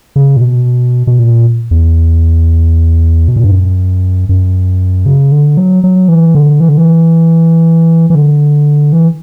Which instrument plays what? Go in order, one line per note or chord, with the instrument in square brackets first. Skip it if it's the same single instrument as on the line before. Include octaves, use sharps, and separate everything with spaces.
[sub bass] C#3
A#2
B2
B2
A#2
E2
B2
A#2
G2
F#2
F#2
C#3
D3
F#3
F#3
E3
D3
E3
D3
E3
E3
D3
E3